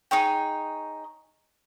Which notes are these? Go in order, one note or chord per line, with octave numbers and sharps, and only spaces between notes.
D#4 G#4 C#5 G5